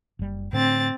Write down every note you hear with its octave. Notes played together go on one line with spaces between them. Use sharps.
F#1 G3
A2 D3 C4 A6